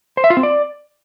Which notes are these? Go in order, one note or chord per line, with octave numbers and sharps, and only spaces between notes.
C5
E5
F4
C4
D5